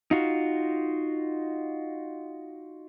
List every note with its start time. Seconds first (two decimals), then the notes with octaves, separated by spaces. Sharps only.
0.11 D#4 F4 F#4